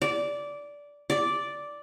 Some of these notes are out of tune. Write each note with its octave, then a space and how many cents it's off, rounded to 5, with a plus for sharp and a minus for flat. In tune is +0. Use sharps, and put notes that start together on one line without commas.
D5 -15
D5 -5